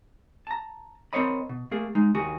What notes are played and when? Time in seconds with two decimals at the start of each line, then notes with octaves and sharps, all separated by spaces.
0.47 A5 A#5
1.13 C4 A#4 C5 C#5 D#5 B5
1.49 B2
1.71 A3 A#3 G#4
1.95 G#3 D#4
2.15 D#2 F#4 G#4